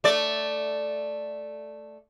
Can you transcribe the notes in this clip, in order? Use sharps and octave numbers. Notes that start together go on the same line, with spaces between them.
A3 D5